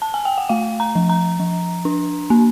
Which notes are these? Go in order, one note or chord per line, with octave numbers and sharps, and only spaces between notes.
A5
G#5
G5
F#5
A3 F5
A#5
F3
A#5
F3
D4
A#3